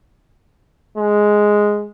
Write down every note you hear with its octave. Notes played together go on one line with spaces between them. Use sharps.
G#3